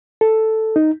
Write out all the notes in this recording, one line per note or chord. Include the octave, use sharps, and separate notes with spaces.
A4
D#4